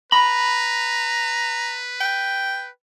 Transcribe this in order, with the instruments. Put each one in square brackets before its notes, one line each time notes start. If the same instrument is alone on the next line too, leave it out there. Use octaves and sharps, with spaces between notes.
[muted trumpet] B4 [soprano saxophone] A#5 [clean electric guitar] B5
[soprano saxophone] G5